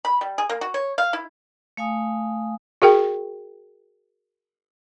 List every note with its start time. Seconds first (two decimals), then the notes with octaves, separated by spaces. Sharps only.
0.05 B5
0.21 G3
0.38 G#4
0.49 A#3
0.61 F#4
0.74 C#5
0.98 F5
1.13 E4
1.77 A3 F5 G#5 D#6
2.82 F#4 G#4 A#4 G5